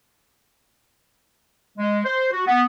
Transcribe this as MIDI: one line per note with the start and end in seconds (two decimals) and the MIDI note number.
1.77 2.00 56
2.04 2.28 72
2.32 2.45 66
2.46 2.63 59